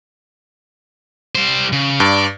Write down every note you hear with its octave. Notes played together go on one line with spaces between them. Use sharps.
G3 C5
C#3
G2 D5